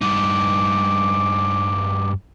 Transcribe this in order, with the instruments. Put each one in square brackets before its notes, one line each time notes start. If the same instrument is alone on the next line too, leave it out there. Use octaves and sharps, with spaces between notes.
[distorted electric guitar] G2 D#4 [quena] D6